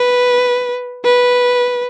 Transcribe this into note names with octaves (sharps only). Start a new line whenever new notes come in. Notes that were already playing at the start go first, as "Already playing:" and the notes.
Already playing: B4
B4